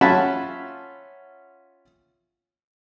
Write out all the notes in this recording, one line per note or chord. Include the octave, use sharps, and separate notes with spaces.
C#4 F4 E5 F#5 A5 B5